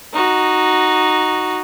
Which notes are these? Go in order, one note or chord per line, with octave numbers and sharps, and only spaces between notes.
D#4 F#4